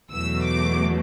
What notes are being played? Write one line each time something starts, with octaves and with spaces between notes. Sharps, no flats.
E2 B2 F#3 A3 E6
D6